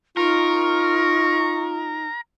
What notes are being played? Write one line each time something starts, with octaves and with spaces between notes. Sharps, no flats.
D#4 F4 A#4 C#6